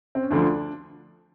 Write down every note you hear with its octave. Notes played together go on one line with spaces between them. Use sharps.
C4
C#4
D2 D3 F3 D4